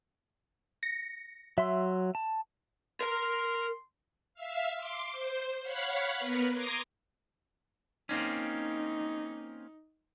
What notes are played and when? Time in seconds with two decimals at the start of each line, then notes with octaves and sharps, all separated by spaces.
0.83 A#6 C#7
1.58 F#3 E5 C6
2.15 A5
3.01 A#4 A#5 C6
4.34 E5 F5
4.76 C6 D6
5.11 C5
5.62 C#5 F5 F#5 B5
6.18 B3 A#4 B4
6.52 A#5 C6 D6 D#6 G#6 A#6
8.09 A#3 C4 C#4 D#4